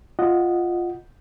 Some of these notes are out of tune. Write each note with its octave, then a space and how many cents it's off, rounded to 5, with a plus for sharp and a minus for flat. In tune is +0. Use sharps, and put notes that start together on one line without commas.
F4 +0 D#5 -10 F#5 +0